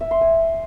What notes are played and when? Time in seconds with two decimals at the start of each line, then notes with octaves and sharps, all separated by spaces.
0.01 E5
0.11 C6
0.21 G#5